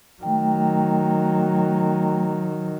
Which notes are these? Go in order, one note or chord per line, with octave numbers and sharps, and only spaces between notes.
D#3 F#3 A3 G5